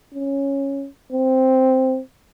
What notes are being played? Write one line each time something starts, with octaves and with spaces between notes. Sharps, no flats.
C#4
C4